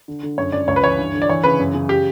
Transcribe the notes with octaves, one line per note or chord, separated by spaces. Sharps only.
D3
D3
F#2 C#5
F#2 D5
C#2 C#5
B4
E3 C#5
G2
D3
D5
E3 C#5
C#3 B4
F#2
C#3
G4